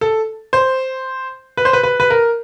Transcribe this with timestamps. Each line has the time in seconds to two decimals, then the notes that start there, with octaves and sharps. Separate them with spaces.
0.01 A4
0.53 C5
1.57 B4
1.65 C5
1.73 B4
1.83 B4
2.00 B4
2.10 A#4